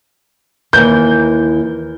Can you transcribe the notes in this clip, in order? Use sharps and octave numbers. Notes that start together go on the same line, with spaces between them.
D#2 E3 G6